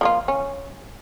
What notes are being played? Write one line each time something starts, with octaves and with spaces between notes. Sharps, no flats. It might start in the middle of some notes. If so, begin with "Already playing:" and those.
F3 A#3 F4
C#4